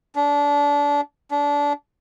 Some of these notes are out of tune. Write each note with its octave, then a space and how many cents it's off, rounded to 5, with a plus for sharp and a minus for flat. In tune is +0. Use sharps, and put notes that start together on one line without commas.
D4 -25
D4 -25